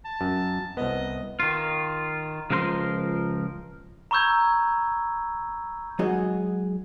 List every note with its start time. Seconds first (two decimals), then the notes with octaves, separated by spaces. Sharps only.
0.05 A5
0.21 F#2
0.77 C2 B3 D#5
1.40 D#3 F4
2.51 C#2 F3 A#4 B4 C6
4.11 A#5 B5 C#6 E6 G6 G#6
5.99 F#3 G#3 D#4 F#4 G#4 D#5